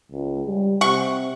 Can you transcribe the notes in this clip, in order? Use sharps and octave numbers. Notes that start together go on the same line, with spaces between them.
C#2
G3
C3 F#5 C#6